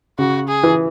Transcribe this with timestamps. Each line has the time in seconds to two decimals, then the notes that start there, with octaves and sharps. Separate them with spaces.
0.19 C#3 F#4
0.48 G#4
0.63 E3